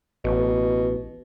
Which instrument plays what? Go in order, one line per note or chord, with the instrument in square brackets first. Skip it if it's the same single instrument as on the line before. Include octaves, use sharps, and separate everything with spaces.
[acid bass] A1 [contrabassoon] B2